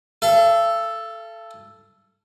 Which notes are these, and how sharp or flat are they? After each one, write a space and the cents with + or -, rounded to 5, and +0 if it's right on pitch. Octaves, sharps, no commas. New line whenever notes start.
A4 +0 F5 -45